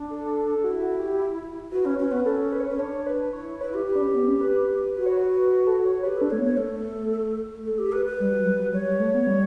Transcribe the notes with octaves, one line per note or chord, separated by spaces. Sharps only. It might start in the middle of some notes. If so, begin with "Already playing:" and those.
Already playing: D4
A4
E4 F#4
F#4
G4
F#4 B4
C#4
C#4
B3
C#4 A4
B4
C#5
C#4 B4
D4 C#5
B4
E4 C#5
E4 B4
G4
G4 B4
D4
C#4
B3
C#4
B4
F#4 B4
C#5
B4
B4
A4
C#5
G4 B4
D4 A4
A3 C#5
B3
C#5
A3 A4
A4
G4
B4
B4
G3
F#3
G3
F#3
G3 C#5
G3
A3
B3
G3